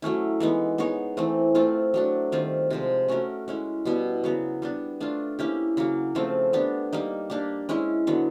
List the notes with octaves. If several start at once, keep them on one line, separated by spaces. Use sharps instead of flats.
F#3 A3 C#4 E4
E3 G#3 B3 D#4
B3 D#4 G#4 C#5
E3 A3 C4
A3 C4 F4 A4
F#3 A3 D4
D#3 G3 C4 F4
C3 F3 G#3
A3 C#4 F#4 A#4
G#3 C#4 E4
B2 G3 B3 E4
C#3 F#3 B3
G3 B3 D4
A3 D4 F4
A#3 C#4 E4 G4
C#3 F#3 A#3
C#3 F3 A3 C4
B3 D4 G4
G3 A#3 D#4
A#3 D4 G4
G#3 C#4 E4
D3 F#3 B3